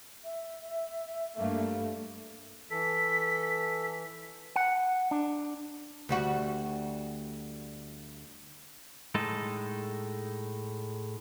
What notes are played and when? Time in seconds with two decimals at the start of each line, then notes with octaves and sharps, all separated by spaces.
0.24 E5
1.37 G2 A3 A#3
2.71 E3 A4 B6
4.56 F#5
5.11 D4
6.09 D2 G3 F#4
9.15 A2 G#3 D#4 A4